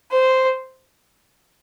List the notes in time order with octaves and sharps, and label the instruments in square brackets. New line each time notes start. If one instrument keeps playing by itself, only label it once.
[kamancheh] C5